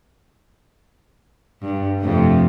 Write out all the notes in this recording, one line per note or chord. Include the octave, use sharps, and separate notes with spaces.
G2
F2 C3 A3